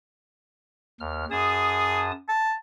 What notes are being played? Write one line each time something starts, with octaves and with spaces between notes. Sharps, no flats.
D#2 F6
F#2 G#4 A5 D#6
A5